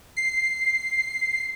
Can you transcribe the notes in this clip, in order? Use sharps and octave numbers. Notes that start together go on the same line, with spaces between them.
C7